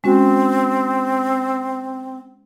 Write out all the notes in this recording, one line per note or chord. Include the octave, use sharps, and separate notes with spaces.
G#3 C4 C#4 F#4